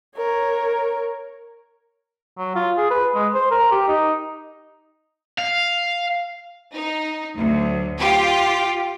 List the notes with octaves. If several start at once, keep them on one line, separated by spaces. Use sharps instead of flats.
A#4 C#5
F#3
F4
G#4
B4
G#3
C5
A#4
G4
D#4
F5
D#4
D2 F#3
F4 G4